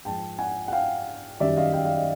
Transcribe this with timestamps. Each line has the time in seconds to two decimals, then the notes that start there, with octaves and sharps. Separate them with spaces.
0.05 G#2 F3 G5 A5
0.39 F#5 G#5
0.68 F#5
0.72 F5 G5
1.40 F#2 D#3 G3 D5 E5
1.57 D#5 F5
1.73 F5 G5
1.85 F5 G5
1.96 D#5 F5